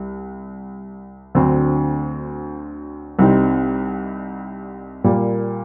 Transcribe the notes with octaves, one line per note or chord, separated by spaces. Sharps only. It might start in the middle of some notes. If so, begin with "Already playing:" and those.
Already playing: C2
D2 D3 F#3 C4
C2 C3 G3 C4 D#4
A#2 G3 A#3